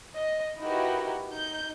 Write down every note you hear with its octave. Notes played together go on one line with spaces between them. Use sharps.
D#5
D#4 E4 F#4 G4 A#4 B4
D#4 G6